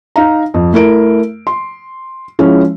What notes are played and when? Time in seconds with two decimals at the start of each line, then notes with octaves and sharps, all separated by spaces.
0.16 D#4 F5 A#5
0.54 F2
0.73 A3 E4 A#4 D7
1.47 C6
2.39 F3 G#3 C#4 E4